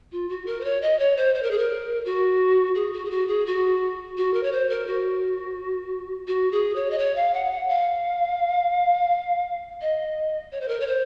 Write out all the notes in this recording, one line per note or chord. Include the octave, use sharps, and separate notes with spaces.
F4
F#4
A#4
C5
C#5
D#5
C#5
C5
C5
A#4
G#4
A#4
F#4
G#4
F#4
G#4
F#4
G#4
F#4
F#4
A#4
C#5
C5
A#4
F#4
F#4
G#4
C#5
D#5
C#5
F5
F#5
F5
F#5
F5
D#5
C#5
C5
A#4
C#5
C5